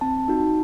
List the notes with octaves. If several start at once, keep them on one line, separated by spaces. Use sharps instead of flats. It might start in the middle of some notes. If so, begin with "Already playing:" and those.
C4 A5
D#4 F#4